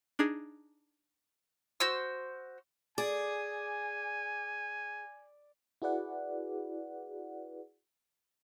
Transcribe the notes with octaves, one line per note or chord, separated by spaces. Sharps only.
D4 D#4 G#4
F#4 C5 E6
G#4 D5 G#5
E4 F#4 G#4 B4 D5 F#5